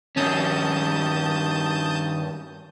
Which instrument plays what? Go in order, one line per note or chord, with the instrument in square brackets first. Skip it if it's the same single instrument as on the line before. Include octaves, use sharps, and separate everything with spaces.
[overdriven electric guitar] G2 C#4 [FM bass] D#3 [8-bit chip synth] A5 D#6 G6